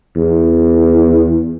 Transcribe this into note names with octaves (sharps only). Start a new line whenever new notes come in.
E2